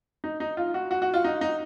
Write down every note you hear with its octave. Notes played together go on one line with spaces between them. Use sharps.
D#4
D#4
F4
F#4
F#4
F#4
F4
D#4
D#4